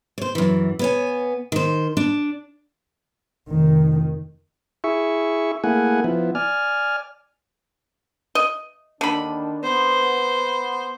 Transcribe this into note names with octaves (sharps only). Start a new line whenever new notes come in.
C5 C#5
F#2 E3
B3 C#5 G#5
D#3 C5
D4
F1 D#3
E4 G#4 E5 C#6
A3 A#3 E4 G#4 F#5 G#5
F3 B3 E4
D5 G#5 F6
D#5
D#2 D3 D#3 D4 B5
B3 C5